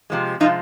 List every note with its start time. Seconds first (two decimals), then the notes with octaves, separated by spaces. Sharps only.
0.10 C3 F3 G#3
0.40 C3 F3 G#3 D#4 F4